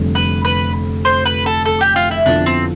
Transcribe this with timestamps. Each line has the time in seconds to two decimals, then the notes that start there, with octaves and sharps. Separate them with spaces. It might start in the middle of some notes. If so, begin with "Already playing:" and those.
Already playing: F1 F2 D3 G3
0.15 B4
0.45 B4
1.05 C5
1.26 B4
1.46 A4
1.66 A4
1.81 G4
1.96 F4
2.11 E4
2.26 F2 D3 F3 B3 D4 E4
2.46 C4